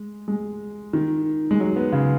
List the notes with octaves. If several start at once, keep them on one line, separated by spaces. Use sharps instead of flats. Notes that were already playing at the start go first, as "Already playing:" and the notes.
Already playing: G#3
G#3
D#3
G#3
F#3
B3
C#3